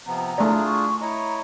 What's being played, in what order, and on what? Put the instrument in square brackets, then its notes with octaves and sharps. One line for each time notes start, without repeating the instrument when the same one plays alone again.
[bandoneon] C3 F3 B3 [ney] A#5
[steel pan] A3 D5 [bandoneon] D4 F4 G#4
[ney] C#6
[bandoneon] E4 C#5 D#5 [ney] A#5